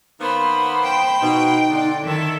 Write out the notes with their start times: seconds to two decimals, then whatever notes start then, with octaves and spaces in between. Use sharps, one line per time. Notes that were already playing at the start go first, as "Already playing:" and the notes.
0.20 D#3 A#3 B3 C5 B5 C6
0.84 G5
1.22 B2 D#4
1.70 D3 D5 C6
2.03 D#3 E4 A4 E5